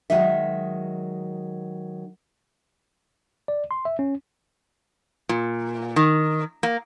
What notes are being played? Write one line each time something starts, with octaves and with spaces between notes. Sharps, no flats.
D#3 F#3 G#3 D#4 E5
D5
C6
E5
C#4
A#2
D#3
A#3